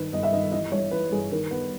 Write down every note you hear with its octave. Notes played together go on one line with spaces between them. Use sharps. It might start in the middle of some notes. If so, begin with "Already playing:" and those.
Already playing: G2 D#3 B4
G1 D#5
E5
D#3 D#5
E3 D#5
G2 C#5
E3 B4
G2 G#4
D#3 A#4
B3 B4